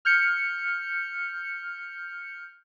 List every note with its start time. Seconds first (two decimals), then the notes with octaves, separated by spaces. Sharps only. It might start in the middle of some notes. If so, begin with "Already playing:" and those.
0.05 F6 G6 C#7